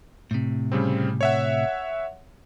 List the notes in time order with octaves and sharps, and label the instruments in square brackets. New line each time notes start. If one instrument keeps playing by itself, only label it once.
[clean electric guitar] A2 C3
[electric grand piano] C#3 G3 C4
C#5 E5 F#5